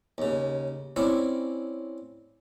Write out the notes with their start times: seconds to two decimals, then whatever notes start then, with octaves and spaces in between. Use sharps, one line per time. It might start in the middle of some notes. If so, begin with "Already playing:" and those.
0.18 D#2 C#3
0.96 C4 C#4 E4 D5